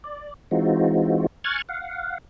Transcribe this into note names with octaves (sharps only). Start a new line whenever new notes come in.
D5
E3 G#3 C4 D#4 F4 F#4
G#5 C#6 F6 F#6 G#6 A6
F5 F#5